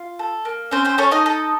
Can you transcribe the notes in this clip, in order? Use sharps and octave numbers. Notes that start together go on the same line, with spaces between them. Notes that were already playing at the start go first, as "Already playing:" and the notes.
Already playing: F4
A4
A#3
C4 C#4 C5
C4 C5
C#4 A4 C#5
D#4 D#5
A4